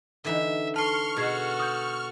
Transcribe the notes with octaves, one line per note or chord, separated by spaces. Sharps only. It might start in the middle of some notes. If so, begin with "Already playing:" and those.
D3 E3 D#4 E5
A4 A5 C6 C#6 F6
B2 F#4 G#4 A4 G#6 C7
D#6 G6